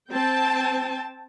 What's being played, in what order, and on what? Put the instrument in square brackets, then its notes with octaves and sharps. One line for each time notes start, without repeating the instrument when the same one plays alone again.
[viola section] C4 G5 A5